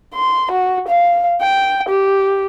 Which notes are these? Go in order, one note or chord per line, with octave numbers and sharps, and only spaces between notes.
C6
F#4
F5
G5
G4